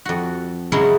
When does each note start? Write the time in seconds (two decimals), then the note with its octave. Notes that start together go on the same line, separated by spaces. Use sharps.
0.05 F2 F#4
0.72 C#3 F#3 G#3 C#4 E4 C6